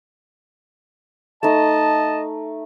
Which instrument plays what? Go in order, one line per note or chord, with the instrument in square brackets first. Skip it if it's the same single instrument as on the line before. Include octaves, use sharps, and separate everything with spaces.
[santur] A3 D#4 [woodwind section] D#5 A5